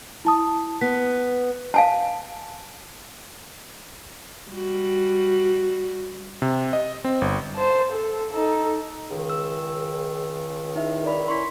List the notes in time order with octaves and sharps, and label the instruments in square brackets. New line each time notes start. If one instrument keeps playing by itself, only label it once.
[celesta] E4 A5 D#6
[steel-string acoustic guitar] B3 [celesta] B6
[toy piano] F5 G#5 A5
[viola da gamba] G3 F#4
[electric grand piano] C3
D#5
C4
G1
[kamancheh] C5 A5
A4
D#4 A4
[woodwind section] C#2 D#3
[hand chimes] E6
D#4 E4 E5
A#4 D5 B5
[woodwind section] C#4 E4 [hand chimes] C6 C#6 B6